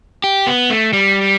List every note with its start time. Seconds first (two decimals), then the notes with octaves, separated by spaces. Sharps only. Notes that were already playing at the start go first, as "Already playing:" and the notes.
0.24 G4
0.47 B3
0.70 A3
0.93 G3